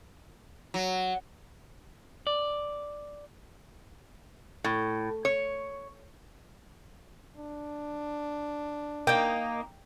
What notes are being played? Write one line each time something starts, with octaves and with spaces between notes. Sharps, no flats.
F#3
D5
A2
C#5
D4
A#3 D#4 G5